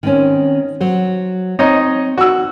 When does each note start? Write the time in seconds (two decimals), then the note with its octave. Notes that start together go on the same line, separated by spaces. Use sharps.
0.03 D#3 C4 C#4
0.80 F#3 C5
1.59 C4 D#4 C#5 D#5
2.18 F#4 E6